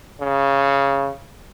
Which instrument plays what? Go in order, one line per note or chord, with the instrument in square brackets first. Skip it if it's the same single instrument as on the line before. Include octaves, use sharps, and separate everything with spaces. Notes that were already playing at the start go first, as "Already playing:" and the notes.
[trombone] C#3